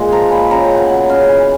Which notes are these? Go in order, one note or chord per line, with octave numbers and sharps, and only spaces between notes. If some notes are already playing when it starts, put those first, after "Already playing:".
Already playing: A#2 G#3 A#3
F3 A#5
A#2 B5
C#3 A#5
G5
B3
F#5
F#3 F#5
C#3 F5
E3